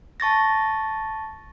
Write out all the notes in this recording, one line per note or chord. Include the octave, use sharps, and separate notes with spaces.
A5 C#6 A6 A#6